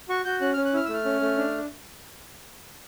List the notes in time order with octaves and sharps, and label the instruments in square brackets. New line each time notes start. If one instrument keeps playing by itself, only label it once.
[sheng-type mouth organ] F#4 C#6
F#4 G6
C#4 F#6
F6
C#4
F#6
E4 F6
E6
A3 F6
C#4
A3
D4